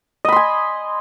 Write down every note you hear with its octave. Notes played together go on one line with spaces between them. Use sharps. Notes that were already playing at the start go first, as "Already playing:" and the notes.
D#5 G#5 B5 C6